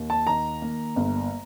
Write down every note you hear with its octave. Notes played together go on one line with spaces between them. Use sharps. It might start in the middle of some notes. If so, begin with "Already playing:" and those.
Already playing: D#2
A5
D#3 A#5
A#3
G1